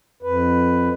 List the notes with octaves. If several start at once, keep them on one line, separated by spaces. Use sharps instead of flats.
F2 B4